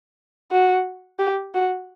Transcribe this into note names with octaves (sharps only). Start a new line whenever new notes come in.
F#4
G4
F#4